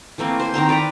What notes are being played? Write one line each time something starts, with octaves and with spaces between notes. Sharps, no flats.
E3 A3 A#3 C4
C5 G#5
D#3 C4 A#5 C6
B4 D5 G5 A#5